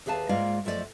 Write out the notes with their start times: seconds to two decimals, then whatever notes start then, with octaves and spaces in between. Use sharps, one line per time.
0.06 D#2 G#4 B4 F5 A5
0.29 G#2 G#3 A#3 F4 D5 F5
0.65 F#2 F3 A3 D4 D5 D#5